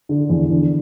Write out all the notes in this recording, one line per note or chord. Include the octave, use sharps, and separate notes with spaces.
D3
E2
D3